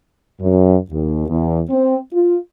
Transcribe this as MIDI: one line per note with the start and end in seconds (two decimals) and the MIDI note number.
0.41 0.77 42
0.91 1.26 39
1.28 1.59 40
1.69 1.97 60
2.13 2.36 65